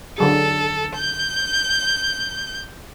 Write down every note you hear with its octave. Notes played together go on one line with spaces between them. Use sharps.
D3 F#3 G#4 A4
G6